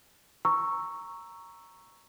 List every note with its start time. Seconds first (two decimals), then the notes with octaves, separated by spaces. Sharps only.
0.45 A#5 C#6 E6